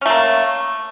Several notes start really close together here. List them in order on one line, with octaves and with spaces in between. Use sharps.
C#4 A3 A#3